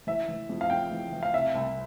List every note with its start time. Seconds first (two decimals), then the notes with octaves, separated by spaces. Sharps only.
0.07 E3 E5
0.29 E3
0.49 F2
0.61 F5
0.70 F2 G5
0.91 E3
1.12 E3
1.23 F5
1.34 C3 E5
1.55 C2